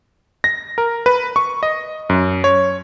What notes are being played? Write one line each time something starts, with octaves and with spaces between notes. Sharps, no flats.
A#6
A#4
B4
C#6
D#5
F#2
C#5